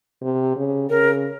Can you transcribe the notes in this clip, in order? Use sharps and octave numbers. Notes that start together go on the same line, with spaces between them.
C3
C#3
C#3 A#4